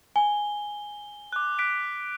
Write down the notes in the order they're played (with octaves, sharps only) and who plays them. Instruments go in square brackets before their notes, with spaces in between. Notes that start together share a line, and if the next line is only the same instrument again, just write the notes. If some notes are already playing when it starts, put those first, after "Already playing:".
[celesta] G#5 [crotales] G7
[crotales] D6 F#6
F#6 B6 D7